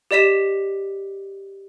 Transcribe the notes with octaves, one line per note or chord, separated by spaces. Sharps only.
G4 D5 D#5 B6 E7